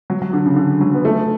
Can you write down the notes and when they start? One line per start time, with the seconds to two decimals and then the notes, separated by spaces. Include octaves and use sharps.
0.10 F#3
0.22 F#3
0.33 D3
0.46 C#3
0.56 D3
0.81 F#3
0.95 B3
1.05 A3